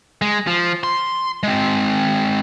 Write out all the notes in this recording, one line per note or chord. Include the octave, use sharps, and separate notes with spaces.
G#3
F3
C6
G#3 C4